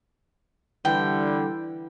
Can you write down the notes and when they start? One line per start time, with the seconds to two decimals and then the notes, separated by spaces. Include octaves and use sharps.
0.85 D3 E3 G3 G5